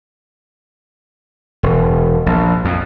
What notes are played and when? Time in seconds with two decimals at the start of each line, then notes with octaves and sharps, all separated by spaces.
1.63 E1
2.26 A#1
2.65 F2